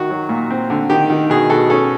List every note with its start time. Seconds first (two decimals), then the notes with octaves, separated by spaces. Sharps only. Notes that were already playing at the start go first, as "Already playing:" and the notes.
Already playing: D#3 F#4
0.10 F#3
0.29 A#2
0.50 C4
0.70 D3
0.90 D#3 G4
1.10 D#3
1.30 B2 G#4
1.50 B2 A4
1.70 C#4 A4